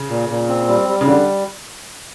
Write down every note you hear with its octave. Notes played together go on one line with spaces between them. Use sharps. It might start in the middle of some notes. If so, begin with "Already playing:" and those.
Already playing: C#3
A#2
A#2
C4
G3
G3
C#3
D3 G3